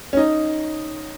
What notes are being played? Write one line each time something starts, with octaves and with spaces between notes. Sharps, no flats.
C#4
D#4